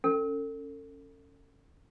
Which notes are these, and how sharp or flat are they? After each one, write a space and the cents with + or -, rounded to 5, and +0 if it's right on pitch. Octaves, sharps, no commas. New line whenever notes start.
C#4 +0 A4 +35